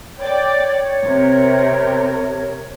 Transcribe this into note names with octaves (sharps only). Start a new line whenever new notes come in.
C#5 D5 G5
C3 A#4